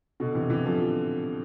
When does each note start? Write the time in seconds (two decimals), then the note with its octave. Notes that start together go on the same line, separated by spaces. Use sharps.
0.20 B2 D3
0.35 C3 E3
0.50 C3 E3
0.65 D3 F3